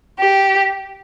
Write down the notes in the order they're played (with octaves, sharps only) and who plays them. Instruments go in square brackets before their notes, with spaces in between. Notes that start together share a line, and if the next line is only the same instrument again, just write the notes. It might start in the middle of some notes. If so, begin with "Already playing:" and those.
[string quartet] G4